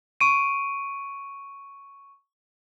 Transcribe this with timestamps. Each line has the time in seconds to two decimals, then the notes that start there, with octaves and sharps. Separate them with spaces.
0.21 C#6 D7 D#7